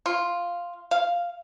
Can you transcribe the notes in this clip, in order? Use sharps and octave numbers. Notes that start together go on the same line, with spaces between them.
F4
F5